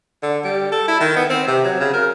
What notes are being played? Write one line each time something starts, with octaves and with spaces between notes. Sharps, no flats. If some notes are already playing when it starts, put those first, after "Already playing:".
D3
G3
A4
E4
D#3
B3
C4
C3
F#3
C#3
A#4